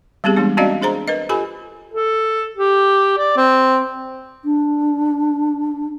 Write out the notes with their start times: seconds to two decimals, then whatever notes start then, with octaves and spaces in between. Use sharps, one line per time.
0.24 G3 B3 C4 G4 G#4
0.36 E3 G#3 B3 D4
0.57 C4 C#4 F#4 D5 D#5 F5
0.82 D4 G#4 C5 A#5
1.08 A#4 B4 D#5
1.29 F4 G4 A4 G#5 B5
1.94 A4
2.57 G4
3.18 D5
3.37 C4
4.45 D4